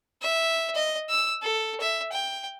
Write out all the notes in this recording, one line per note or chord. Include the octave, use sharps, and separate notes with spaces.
E5
D#5
E6
A4
E5
G5